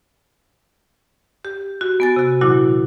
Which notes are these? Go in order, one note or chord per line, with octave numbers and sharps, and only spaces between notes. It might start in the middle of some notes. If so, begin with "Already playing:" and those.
G4
F#4
B3 G#5 A6
C3 F#4
A#2 D#3 F#3 E4 F#4